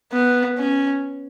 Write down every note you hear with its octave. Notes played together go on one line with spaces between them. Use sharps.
B3
C#4